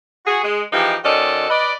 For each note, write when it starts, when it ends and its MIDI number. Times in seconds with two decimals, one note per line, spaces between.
0.26 0.43 66
0.26 0.43 68
0.43 0.62 56
0.72 0.95 52
0.72 0.95 53
0.72 0.95 56
0.72 0.95 63
0.72 0.95 67
1.04 1.46 51
1.04 1.46 61
1.04 1.46 66
1.04 1.46 69
1.04 1.46 74
1.04 1.46 75
1.50 1.73 71
1.50 1.73 74
1.50 1.73 75